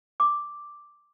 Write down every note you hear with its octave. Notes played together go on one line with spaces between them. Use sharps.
D6